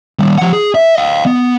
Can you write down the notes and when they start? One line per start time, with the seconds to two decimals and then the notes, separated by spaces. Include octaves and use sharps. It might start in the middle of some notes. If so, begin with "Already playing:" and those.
0.19 D#3 G3
0.38 F3 F#5
0.53 G#4
0.75 E5
0.95 D#5 F5
1.26 B3